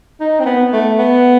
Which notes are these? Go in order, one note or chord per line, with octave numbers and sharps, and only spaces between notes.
D#4
C4
B3
A3
B3